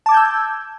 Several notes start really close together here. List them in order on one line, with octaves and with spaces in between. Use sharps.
A5 D6 G#6 G6 E6